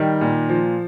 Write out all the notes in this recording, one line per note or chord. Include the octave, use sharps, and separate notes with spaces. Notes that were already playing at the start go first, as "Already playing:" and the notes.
Already playing: D#3 G3
A#2
F3